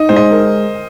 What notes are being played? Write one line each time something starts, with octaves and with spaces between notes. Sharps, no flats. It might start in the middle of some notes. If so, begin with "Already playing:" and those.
Already playing: D#4 D#5
G#3 C5
D#5
A#4